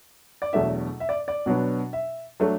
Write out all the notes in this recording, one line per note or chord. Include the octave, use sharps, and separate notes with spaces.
D5
E2 B2 F#3 A3 D4 E5
E5
D5
D5
B2 F#3 B3 D4
E5
F#3 A3 D4